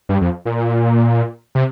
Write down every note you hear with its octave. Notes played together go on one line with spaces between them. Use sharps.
G2
F2
A#2
C3